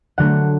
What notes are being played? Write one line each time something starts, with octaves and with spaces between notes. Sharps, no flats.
D3 F#3 A3 F#5